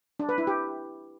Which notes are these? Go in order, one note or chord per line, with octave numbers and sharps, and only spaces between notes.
D4
B4
E4
G4